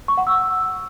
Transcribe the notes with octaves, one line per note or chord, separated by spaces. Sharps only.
C#6
F#5
E6